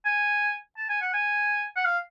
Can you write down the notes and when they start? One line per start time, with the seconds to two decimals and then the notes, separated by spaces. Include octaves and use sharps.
0.05 G#5
0.77 A5
0.89 G#5
1.02 F#5
1.13 G#5
1.76 F#5
1.85 F5